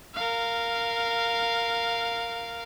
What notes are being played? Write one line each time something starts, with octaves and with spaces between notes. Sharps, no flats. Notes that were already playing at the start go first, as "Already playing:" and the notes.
A#4 F5